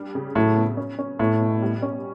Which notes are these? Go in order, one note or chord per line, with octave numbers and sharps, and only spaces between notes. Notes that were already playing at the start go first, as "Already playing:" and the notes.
Already playing: G3 D4
C#3
A2 F#3
B3
C#4
C#4
A2 B3
B2
G3
C#4